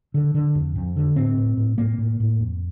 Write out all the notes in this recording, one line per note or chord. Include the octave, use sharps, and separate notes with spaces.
D3
D3
F2
F2
D3
A2 C4
A2
A2
A2 A#3
A2
A2
F2